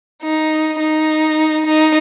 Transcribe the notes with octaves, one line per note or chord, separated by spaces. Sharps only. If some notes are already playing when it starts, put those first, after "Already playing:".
D#4
D#4
D#4